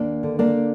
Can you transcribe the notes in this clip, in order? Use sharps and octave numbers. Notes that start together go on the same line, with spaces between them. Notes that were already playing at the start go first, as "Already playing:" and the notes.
Already playing: D#2 A#3 D4
D3
A#3 D4